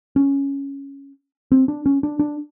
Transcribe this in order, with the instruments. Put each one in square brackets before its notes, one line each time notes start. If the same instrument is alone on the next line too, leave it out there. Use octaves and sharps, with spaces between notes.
[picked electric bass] C#4
C4
D4
C#4
D4
D4